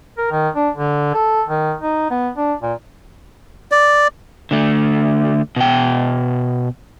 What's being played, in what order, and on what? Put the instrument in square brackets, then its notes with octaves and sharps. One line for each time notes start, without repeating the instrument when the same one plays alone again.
[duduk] A#4
D#3
D4
D3
A4
D#3
D#4
B3
D4
A#2
[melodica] D5
[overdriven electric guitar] D3 A3
B2 G5